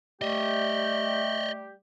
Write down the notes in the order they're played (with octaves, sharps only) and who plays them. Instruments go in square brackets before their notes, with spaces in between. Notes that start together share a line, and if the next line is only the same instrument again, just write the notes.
[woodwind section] G3 A3 G4 [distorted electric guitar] D#5 E5